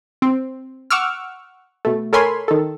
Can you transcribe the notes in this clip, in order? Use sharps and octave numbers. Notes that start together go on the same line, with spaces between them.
C4
F#5 C#6 D6 E6 F6
B2 A3
A4 A#4 C#5 G#5 B5 C6
D#3 A4